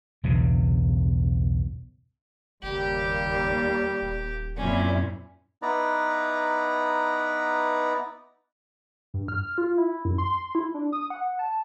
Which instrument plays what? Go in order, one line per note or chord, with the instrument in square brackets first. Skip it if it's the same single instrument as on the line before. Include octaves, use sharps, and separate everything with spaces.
[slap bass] B1 E2 G2 C#3
[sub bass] F#1 [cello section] D#2 A#3 [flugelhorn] G3 [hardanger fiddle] G4
[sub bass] D#1
[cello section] F#2 A#2 E4 [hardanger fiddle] C4 C#4 [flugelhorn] D5
[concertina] B3 D#4 E4 B4 D5 A#5
[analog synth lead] G2
F6
F4
E4
F#2
C6
E4
D4
D#6
F#5
A5